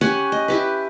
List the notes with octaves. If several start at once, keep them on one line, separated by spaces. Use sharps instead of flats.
C#4 G4 F#5 G#5
D#5
E4 G4 B4